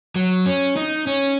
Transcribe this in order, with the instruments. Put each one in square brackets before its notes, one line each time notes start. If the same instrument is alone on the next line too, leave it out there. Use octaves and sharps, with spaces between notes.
[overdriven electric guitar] F#3
C#4
D#4
C#4